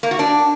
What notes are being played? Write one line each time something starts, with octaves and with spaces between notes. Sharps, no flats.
A#3
F#4
D4